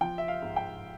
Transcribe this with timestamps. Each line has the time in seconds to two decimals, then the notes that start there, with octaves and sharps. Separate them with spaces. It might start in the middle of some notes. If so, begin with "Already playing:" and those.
0.01 F3 G5
0.18 E5
0.28 F5
0.42 G#2
0.56 G5